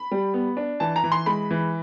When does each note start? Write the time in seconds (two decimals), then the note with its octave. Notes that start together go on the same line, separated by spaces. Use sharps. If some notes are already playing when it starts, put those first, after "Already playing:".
Already playing: B5
0.11 G3
0.34 B3
0.57 D4
0.80 E3 A5
0.96 A#5
1.04 E3
1.12 C6
1.26 G#3 B5
1.51 E3